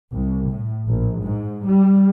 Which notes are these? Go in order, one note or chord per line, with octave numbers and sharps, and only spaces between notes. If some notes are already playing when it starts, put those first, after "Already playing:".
C2
A2
A#1
G#2
G3